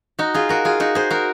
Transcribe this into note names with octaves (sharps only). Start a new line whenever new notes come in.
D#4 F#4
F4 G#4
F#4 A#4
F4 G#4
D#4 F#4
G#4 C5
F#4 A#4